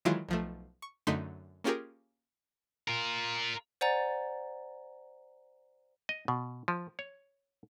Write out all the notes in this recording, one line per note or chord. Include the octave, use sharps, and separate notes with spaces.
D#3 E3 F#3 G#3 E4 F4
B1 F3 A3
C#6
F#2 D3 A3 D#4 C6 B6
A#3 C#4 F4 G4 G#4 A#4
F4 A#4
C5 D5 F#5 G#5 A#5 A6
D#5
B2
F3
C#5